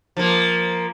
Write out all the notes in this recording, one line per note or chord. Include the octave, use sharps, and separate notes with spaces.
F3 A#3